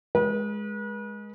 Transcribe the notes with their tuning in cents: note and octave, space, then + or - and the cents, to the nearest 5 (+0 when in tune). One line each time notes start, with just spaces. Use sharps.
G#3 +5 B4 -40